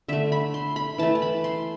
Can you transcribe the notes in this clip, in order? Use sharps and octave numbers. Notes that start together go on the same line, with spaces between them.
D3 A3 E5
B5
C6
B5
E3 A3 A5
A5
B5
C6